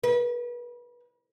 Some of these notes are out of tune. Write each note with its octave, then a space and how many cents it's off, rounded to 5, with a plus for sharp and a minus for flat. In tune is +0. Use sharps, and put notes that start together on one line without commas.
B4 -35